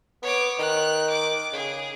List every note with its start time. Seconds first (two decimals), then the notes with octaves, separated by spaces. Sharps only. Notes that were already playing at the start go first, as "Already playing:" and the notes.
0.22 B3 C#5 D6
0.59 D#3 F#6
1.10 D6
1.53 C#3 G#4